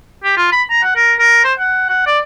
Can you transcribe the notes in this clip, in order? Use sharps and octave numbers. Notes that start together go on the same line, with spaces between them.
G4
F4
B5
A#5
F#5
A#4
A#4
C5
F#5
F#5
D5